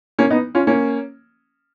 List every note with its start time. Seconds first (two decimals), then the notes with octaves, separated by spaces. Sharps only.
0.19 A#3 C#4
0.30 B3 D#4
0.55 C#4 F4
0.67 A#3 C#4